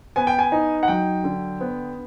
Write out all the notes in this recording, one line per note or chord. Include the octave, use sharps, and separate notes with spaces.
B3 G#5
G5
G#5
D#4
F#5
F#3 G5
D3
B3